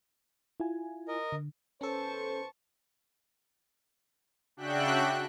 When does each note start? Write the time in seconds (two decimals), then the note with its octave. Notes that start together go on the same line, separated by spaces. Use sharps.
0.60 E4 F4 G#5
1.08 A#4 D#5
1.32 D3
1.81 E2 C#4 A4 B4 C5 A5 C#6
4.57 C#3 D4 F#4 E5 G5 F#6